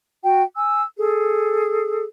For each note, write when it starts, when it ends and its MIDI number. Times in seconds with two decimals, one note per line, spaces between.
0.24 0.43 66
0.24 0.43 79
0.55 0.82 80
0.55 0.82 88
0.97 2.04 68
0.97 2.04 69